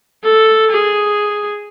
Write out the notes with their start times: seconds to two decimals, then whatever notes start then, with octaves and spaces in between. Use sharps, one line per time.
0.24 A4
0.71 G#4